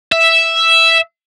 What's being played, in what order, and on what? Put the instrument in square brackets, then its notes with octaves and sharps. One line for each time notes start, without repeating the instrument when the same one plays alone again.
[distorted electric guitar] E5